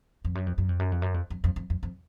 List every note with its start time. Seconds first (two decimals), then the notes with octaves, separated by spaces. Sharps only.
0.25 F2
0.35 F#2
0.47 F2
0.58 F#2
0.69 F2
0.79 F#2
0.92 F2
1.02 F#2
1.14 F2
1.30 F2
1.44 F2
1.56 F2
1.70 F2
1.83 F2